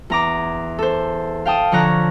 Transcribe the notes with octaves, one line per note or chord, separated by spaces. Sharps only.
E2 A#5 D6
A4 C5
F5 G5 A5 D#6
D3 F3 C#5 A#5 F#6